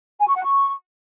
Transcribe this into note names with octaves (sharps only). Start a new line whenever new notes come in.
G#5
C#6
F#5
C#6